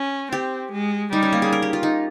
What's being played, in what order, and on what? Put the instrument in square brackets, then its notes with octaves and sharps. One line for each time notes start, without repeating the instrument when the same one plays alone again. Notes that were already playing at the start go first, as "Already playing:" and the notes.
Already playing: [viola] C#4
[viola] C4 [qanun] G4
[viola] G#3
[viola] G3 [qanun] D#4
[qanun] C#4
A#3
G#4
A#4
G4
F4
D#4